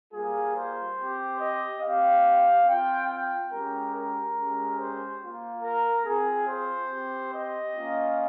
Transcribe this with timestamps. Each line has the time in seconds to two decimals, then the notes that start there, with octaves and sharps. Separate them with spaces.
0.13 G3 A#3 F4 G#4
0.56 C5
0.98 C4 G4
1.39 D#5
1.82 C4 G4 F5
2.66 C4 F4 G5
3.10 G5
3.51 G#3 C#4 G4 A#4
3.94 A#4
4.36 G#3 C#4 G4
4.78 C5
5.21 A#3 F4
5.63 A#4
6.05 C4 F4 G#4
6.47 C5
6.90 C4 G4
7.32 D#5
7.75 A#3 C#4 F4